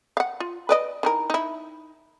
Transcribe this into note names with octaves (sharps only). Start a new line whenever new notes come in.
F5 F#5
F4
B4 D5 D#5
D#3 E3 A#4
D#4 E4